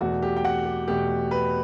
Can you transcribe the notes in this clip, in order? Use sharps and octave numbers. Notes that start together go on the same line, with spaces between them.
E2 B2 A3 F#4
G4
G5
F#5
G4
E2 B2 A3 G4
B4